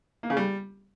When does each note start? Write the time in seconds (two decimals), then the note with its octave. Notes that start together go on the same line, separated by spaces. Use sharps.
0.23 A#3
0.30 C#3
0.37 G3